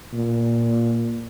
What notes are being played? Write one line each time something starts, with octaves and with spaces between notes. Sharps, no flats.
A#2